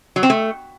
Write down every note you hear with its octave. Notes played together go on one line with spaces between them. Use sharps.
F#3
C4
A3